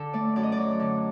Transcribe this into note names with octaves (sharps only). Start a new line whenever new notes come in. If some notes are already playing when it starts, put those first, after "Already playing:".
Already playing: D3 A4
A3 D5
F#2 D5
D#5
D5
F#3
D3